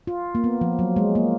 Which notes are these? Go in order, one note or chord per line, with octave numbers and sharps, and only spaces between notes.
F4
A#3
B3
F3
F#3
G#3
A#3